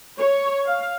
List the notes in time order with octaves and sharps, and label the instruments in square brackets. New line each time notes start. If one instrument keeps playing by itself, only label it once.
[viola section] C#5
F5